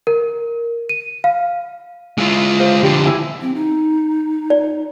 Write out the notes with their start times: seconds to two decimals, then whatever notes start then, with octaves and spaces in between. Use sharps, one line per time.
0.07 A#4
0.89 D#7
1.24 F5
2.18 G#3 E4 F4
2.59 C5 F5
2.83 D3 F3 G4
3.06 E4 G#5
3.41 C4
3.55 D#4
4.50 D5